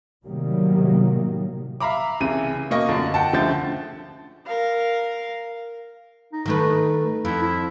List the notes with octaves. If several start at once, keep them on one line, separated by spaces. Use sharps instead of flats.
A2 C3 D#3 F#3 G3 A#3
E5 F5 A#5 B5 D6
C2 C#3 E3 D#7
B2 A#3 D#5 C#6 A#6
F#2 D3 D4 F4
F#5 G5 A5
C#2 D3 F3 A3 G6 A6
A#4 F5
D#4
D#3 A3 B4
F2 E4
E4